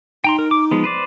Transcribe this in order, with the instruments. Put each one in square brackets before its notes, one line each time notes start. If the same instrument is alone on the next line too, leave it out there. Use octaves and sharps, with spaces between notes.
[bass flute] D#4 [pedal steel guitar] G5 A#5 C6
[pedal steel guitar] A#4
D6
F3 G#3 B3
B4 C5 D5